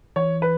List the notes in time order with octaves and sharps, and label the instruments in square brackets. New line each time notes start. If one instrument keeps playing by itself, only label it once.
[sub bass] E3 [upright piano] C#5
[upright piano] B4